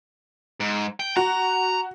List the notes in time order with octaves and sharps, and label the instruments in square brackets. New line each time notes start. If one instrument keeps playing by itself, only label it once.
[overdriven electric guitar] G#2
G5
[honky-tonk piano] F#4 [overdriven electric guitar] A#5